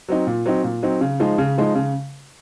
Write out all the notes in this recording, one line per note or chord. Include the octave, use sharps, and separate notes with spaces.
F#3 C4 D#4
A#2
F#3 C4 D#4
A#2
F#3 C4 D#4
C#3
F3 G#3 D#4
C#3
F3 G#3 D#4
C#3